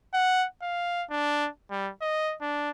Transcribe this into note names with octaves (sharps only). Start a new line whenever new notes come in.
F#5
F5
D4
G3
D#5
D4